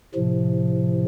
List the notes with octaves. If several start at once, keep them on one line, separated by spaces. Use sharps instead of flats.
A2 C3 F3